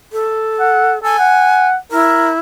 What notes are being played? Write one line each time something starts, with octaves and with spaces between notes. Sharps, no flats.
A4
F#5
A4 G#5
F#5
E4 A#4